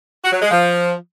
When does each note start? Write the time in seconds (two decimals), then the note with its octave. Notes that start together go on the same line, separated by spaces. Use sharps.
0.23 F#4
0.32 F#3
0.42 G#3
0.51 F3